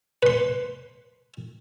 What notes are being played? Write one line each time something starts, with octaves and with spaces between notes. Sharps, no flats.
B4 C6